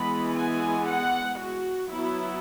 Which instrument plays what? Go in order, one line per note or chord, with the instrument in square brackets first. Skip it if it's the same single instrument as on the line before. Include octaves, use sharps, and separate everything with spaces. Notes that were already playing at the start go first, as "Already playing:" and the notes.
Already playing: [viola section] E3 G#3 B3 B5
G#5
F#5
F#4
F#3 B3 E4